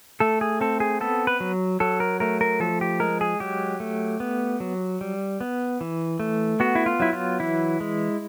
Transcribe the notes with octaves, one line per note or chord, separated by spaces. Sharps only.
A3 A4
G#4
C4 A4
G#4
B3 A4
B4
F#3
F#3 A4
A#4
A3 A#4
A#4
F3 A4
G4
G#3 A#4
G#4
F#3 G4
A3
B3
F#3
G3
B3
E3
A3
B3 F#4
E4
F4
F#3 E4
F4
E3 E4
G#3